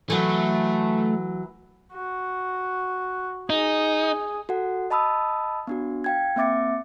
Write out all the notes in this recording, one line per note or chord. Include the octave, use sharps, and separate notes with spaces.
E3 F#3 A3
F#4
D#4 G#4
F#4 A4 F#5
D#5 A5 B5 D#6 E6
B3 D4 F#4
F5 G5 G#6
A#3 C4 E5 D6 A6 C#7